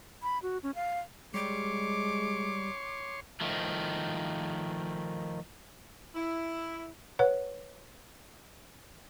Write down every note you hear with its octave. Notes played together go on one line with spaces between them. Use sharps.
B5
F#4
C#4
F5
G3 G#3 C#5 C6 D6
D#3 F3 A3
E4
B4 C#5 F#5